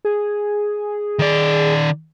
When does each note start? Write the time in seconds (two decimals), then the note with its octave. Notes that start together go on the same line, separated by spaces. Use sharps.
0.05 G#4
1.19 D#3 D5